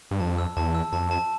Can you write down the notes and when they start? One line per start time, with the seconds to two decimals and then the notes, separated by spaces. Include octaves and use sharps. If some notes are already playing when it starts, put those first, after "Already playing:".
0.11 G2
0.20 F2 A5
0.38 E6
0.56 E2 A5
0.75 E6
0.93 F2 A5
1.11 A5